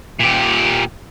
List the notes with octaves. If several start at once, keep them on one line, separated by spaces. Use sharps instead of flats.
A#2 G4